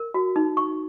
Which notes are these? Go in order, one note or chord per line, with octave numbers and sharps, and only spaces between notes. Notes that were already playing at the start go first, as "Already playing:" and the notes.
Already playing: A#4
F#4
D#4
C#6